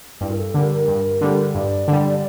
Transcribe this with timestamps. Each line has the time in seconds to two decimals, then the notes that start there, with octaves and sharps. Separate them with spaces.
0.21 G2 E4
0.30 A#4
0.38 A4
0.54 D3 G3 A#4
0.71 A#4
0.88 G2
1.21 D3 G3
1.55 G2 D5
1.88 D3 G3